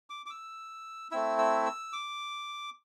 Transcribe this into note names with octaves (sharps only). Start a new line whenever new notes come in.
D6
D6
E6
A3 C4 E4 E6
E6
E6
D6